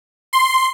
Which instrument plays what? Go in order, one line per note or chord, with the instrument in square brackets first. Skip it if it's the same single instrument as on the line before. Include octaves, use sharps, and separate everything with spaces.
[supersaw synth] C6